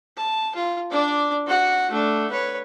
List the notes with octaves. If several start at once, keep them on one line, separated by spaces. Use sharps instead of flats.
A5
F4
D4 D5
F#4 F#5
A3 D4
B4 C#5